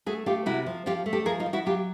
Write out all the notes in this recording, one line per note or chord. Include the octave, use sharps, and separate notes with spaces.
A3 F#4 G#4
A3 F4 G4
C3 E4 F#4
F3
F3 F4 G4
A3
G4 A4
F3 G#4 A#4
D#4 F4
F3
E4 F#4
F#3 F4 G4